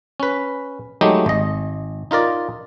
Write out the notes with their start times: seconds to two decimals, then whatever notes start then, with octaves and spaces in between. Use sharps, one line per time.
0.20 C#4 B4
1.01 F#3 G#3 A3 D#4 G4
1.26 G#1 D#5
2.11 D#4 F4 A#4 D5